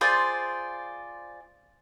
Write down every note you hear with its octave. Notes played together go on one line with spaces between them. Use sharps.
F4 G#4 C5 D5